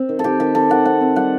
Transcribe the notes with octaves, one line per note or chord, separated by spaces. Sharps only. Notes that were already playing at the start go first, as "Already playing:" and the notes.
Already playing: C4
D#3
A4
D#3 G4
D#3 G4
D#3 A4
D#3 F#5
C4 F#5
C4
G3 F#5